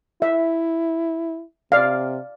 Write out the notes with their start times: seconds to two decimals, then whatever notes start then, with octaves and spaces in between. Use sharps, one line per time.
0.22 E4 E5
1.72 C3 D5 F5